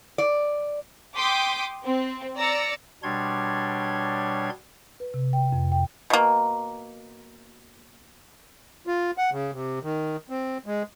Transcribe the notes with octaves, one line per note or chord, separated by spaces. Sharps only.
D5
G5 C6 D6 D#6 G6 B6
C4
D5 A#5 E6 A#6 C#7
B2 G3 D4 C#5 C6 G#6
B4
C3
G5
F2
G5
B2 A#3
F4
F#5
C#3
C3
D#3
C4
G#3